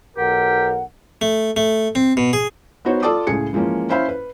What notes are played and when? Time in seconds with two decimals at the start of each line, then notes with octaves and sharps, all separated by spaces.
0.18 B1 G4 A#4 F#5
1.21 A3
1.57 A3
1.95 C4
2.17 B2
2.33 G#4
2.85 B3 D#4 F#4 C5 C#5
3.02 F4 A4 D5 A5 D6 D#6
3.27 C#2 A2 G#4 C#7
3.53 E3 F3 G#3 A#3 C#4
3.89 C#4 E4 C5 E5 F5 B5
4.09 B4